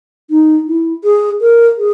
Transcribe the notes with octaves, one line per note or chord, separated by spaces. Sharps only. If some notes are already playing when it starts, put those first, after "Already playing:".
D#4
E4
G#4
A#4
G#4